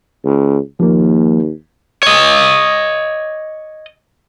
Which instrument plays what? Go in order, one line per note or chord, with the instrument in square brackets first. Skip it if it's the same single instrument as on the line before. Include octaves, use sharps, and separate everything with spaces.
[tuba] C#2
[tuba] D#2 [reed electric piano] F3 A#3
[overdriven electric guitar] C#5 D#5